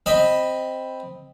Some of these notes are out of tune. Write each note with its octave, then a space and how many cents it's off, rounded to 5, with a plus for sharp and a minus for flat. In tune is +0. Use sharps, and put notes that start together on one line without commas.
C4 +0 D#5 +0 B5 +0